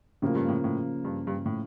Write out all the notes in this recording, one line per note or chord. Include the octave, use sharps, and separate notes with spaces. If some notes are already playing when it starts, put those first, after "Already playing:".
A2 C#3 F3 A#3
G2
A2
A2
G2
G2
A2